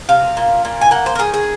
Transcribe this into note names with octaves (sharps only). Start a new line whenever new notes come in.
C3 F5
A#2
A#2
G#5
A#3 F#5
C5
A#4
D#3 G#4
G#4